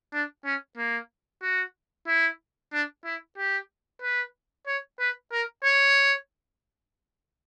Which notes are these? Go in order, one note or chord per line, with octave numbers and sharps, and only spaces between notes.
D4
C#4
A#3
F#4
E4
D4
E4
G4
B4
C#5
B4
A#4
C#5